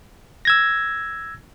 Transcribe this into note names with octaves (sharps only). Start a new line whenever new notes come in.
E6 G#6 A#6